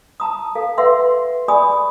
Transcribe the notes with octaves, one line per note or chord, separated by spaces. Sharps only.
A5 A#5 D#6
A4 F5
B4 E5 F#5 C6
G#4 D5 G#5 B5 C#6 D#6